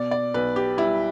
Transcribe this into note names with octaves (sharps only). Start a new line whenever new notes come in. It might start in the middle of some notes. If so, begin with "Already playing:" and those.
Already playing: B2 D5
D5
B1 B4
G4
G3 E4